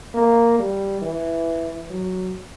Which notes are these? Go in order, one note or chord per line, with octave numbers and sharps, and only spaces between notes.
A#3
G3
E3
F#3